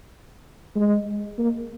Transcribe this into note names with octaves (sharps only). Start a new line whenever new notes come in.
G#3
A#3